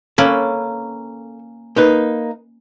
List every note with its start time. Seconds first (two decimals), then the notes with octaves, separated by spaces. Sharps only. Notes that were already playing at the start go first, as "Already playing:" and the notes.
0.18 A#3 C#4 A4 B4
1.76 A#3 D#4 B4